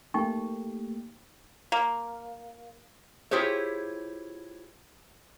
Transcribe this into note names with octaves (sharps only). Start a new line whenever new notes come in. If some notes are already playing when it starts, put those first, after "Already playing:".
A3 A#3 D#4 G4 G5 C#6
A#3
E4 F4 G4 G#4 C5 C#5